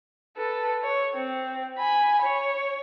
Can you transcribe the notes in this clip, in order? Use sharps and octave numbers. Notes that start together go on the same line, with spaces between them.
A4 B4
C#5
C4
G#5 B5
C#5